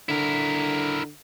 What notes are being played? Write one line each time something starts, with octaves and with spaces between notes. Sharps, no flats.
D3 E4 A#4